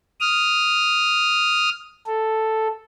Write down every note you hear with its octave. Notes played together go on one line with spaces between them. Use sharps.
D#6 F6
A4